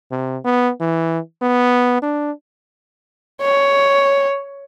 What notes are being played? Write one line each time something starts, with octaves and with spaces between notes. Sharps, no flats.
C3
B3
E3
B3
D4
C#5